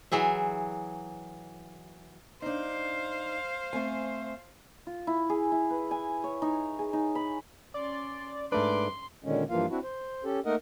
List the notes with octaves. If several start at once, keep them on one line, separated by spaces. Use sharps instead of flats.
E3 F#3 G#4 E5
D4 D#4 C5 F5
A3 C4 G#5
F4
E4
G#4
E4
B4
G#5
C#5
D#4
G#4
D#4
B5
C#4 D5 C6
G#2 A3 D4 B4 C6 D6
A#2 D3 D#3 G#3 C#4
G2 E3 F3 A#3 F4 F5
C4 D4 E4 F#4
C5
C#4 G4 A4
A3 A#3 D#4 A#4 D#5 F#5